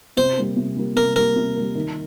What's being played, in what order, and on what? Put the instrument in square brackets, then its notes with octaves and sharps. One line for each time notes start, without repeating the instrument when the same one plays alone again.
[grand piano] C3 [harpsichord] C5
[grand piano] G3 A#3
C3
G3 A#3
[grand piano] C3 [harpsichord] A#4
[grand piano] G3 A#3 [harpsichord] A#4
[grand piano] C3
G3 A#3
D#3